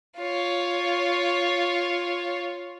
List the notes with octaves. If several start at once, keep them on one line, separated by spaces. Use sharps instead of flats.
F4 C#5